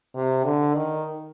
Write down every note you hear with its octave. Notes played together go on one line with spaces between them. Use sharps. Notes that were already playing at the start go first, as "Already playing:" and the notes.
C3
D3
D#3